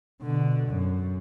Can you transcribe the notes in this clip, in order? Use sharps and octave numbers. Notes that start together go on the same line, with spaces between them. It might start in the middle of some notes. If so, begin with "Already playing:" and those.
B2 D3
F#2